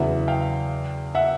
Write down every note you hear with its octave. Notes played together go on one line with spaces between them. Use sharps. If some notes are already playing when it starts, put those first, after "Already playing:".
Already playing: E2 C#3 F#3 B3 E4 E5 F#5
F5 G5
E5 F#5